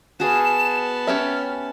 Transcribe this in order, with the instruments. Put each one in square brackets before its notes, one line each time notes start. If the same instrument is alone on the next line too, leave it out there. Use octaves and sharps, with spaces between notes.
[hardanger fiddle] B3 A5 [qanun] F#4 G#4 F5 [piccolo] E7
[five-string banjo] C#4 G4 E5 [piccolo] F6